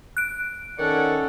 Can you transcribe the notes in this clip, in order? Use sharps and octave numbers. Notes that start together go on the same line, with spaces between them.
F#6 D7
D#3 C#4 A4 C#5 D5 F#5